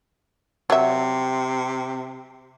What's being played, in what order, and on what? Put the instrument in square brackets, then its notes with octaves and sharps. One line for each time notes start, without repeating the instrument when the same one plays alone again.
[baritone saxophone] C3 [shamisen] F#3 E5